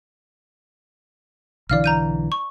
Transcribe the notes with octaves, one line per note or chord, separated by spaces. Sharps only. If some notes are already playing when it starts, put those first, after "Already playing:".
B1 D3 E3 D5 F5 F6
A#5 G6 D#7
C#6